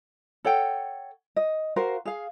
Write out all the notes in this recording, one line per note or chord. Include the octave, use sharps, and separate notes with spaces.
A4 C#5 F#5 G5
D#5
F#4 A#4 C5 F5
G#4 F5